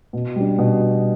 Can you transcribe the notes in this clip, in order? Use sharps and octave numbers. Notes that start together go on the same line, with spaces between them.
B2
G3 D4
B2